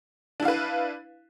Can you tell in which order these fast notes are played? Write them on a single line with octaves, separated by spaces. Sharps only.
D4 E4 F5 B4